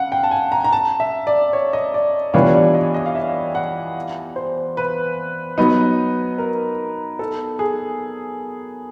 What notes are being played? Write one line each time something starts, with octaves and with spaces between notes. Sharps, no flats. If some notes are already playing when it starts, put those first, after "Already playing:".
Already playing: C#3 F5 F#5
G5
A5
G#5
A#5
A#5
A5
E5
D5
C#5
D#5
D5
E3 G3 B3 D4 F4 C#5
D5
D#5
D#5
F5
E5
F#5
C5
B4
F#3 B3 D#4
A#4
A4
G#4